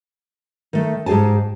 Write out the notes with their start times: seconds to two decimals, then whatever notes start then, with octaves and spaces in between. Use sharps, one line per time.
0.73 D#3 A3
1.06 G#2 G4 G#4 G#5 A5